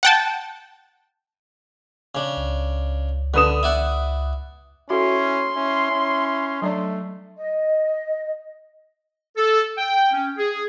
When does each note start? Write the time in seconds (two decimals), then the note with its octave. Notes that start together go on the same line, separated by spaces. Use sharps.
0.03 F#5 G5 A5
2.15 C#3 D4
2.37 C#2
3.34 D3 B4 D#6 E7
3.63 E4 D5 F#5
4.90 C#4 E4 F#4 A4 C6
5.56 C#4 E4
5.91 C#4
6.62 F#3 A3 D4 D5
7.36 D#5
9.36 A4
9.78 G5
10.12 C#4
10.37 G#4